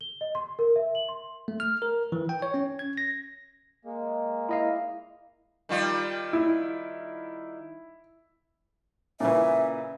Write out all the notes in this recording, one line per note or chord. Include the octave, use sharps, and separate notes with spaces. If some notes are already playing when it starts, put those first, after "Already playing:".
G7
D#5
C6
A#4
E5
F#7
C6
A3
F6
A#4
E3
G5
C#5
C#4
G#6
A#6
G#3 A#3
E4 D#5 F5
D#3 G3 F4
E4
A#2 C#3 E3 E5